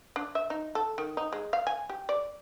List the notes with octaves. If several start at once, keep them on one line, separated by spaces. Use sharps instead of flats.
D4
E5
D#4
A4
D#3
D#4
G#3
F5
G#5
G4
D5